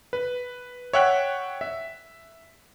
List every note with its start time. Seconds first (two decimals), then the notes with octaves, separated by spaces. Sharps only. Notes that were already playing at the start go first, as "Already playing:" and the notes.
0.13 B4
0.93 C#5 E5 F#5 G5 F#6 B6
1.61 E5